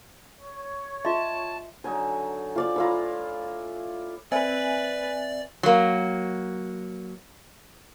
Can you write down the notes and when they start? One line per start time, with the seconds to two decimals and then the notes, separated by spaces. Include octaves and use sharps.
0.41 C#5
1.05 F4 D#5 E5 A5 C6
1.84 D3 F#3 D#4 G#5
2.56 F4 D5 F5
2.76 A2 E4 F4 F5 A#5 B5
4.32 C4 B4 D5 E5 G#5
5.63 F#3 A#3